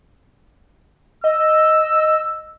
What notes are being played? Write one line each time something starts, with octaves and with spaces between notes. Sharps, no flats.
D#5 E6